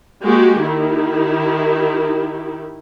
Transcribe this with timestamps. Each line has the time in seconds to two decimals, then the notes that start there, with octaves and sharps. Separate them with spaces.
0.23 G#3 A#3 F#4 G4
0.65 D#3 E4 G4